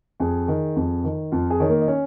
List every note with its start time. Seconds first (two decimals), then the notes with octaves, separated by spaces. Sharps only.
0.20 F2 G#4
0.48 D#3
0.76 F2
1.04 D#3
1.32 F2 F4
1.50 G#4
1.60 D#3 C#5
1.69 A#3 A#4
1.81 D#5
1.88 C#4 C#5